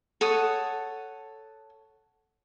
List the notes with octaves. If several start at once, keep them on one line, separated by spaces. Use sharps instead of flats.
A4 C#5 F#5 D#6